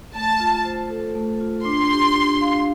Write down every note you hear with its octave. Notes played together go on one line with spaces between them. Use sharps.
A3 A5
F4
C5
A4
A3
F4
D4 C6
G4
D4
F5